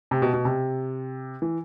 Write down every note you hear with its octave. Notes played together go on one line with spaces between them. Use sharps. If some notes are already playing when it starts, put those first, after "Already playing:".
C3
B2
B2
C3
E3